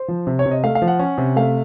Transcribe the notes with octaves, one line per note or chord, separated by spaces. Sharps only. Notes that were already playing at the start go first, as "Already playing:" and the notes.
Already playing: C5
F3
C3
C#5
C3
D#5
A3 F5
F5
F3
F#5
C#4
C3
A3 F5